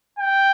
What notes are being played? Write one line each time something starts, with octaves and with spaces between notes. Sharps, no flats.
G5